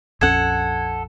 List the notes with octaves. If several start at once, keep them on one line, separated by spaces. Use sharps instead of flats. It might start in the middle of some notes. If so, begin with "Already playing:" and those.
A#1 F2 C#4 A4 F#5 G#6